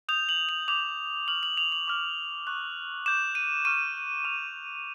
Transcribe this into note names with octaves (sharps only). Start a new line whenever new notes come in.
D#6 G6 F7
F#7
F7
D6 G6 F7
C#6 F6 F#7
F#7
F7
F#7
D6 F6
C#6 F#6
D6 G6 E7
D#7
C#6 F6 D#7
C#6 F6 F7